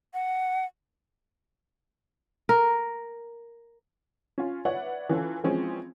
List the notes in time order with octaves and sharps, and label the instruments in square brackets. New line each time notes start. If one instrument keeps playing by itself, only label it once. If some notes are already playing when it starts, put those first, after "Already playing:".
[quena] F#5
[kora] A#4
[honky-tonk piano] C#4 F4
B4 C#5 D5 E5 F#5
E3 C#4 F4 A4
E3 F3 G#3 C4 C#4